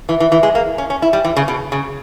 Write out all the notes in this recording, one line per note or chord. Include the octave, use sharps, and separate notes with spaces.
E3
E3
E3
G#3
A#3
C#4
C#4
E4
G3
E3
C#3
B2
C#3